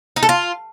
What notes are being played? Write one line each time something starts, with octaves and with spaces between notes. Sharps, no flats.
D#4
A4
F4